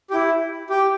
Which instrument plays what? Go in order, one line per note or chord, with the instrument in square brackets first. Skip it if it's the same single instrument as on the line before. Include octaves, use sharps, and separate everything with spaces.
[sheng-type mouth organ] G4
E4
G4